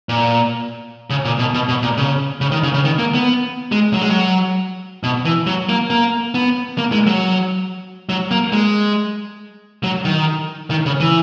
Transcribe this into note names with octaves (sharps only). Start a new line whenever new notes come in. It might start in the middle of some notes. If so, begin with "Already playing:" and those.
A#2
C#3
A#2
B2
B2
B2
A#2
C#3
C#3
D#3
C#3
C#3
D#3
A#3
B3
G#3
F#3
G#3
F#3
B2
E3
F#3
A#3
A#3
B3
A#3
G#3
F#3
F#3
A#3
G#3
F#3
D#3
D#3
C#3
E3